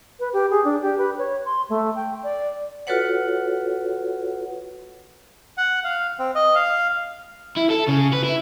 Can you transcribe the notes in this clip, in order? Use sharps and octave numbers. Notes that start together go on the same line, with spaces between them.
B4
G4
G#4
D4
G4
B4
C#5
C6
A3
G5
D5
F4 F#4 A4 B4 C#5 F#5
F#5
F5
C4
D#5
F5
E4
A4
C#3
B4
E4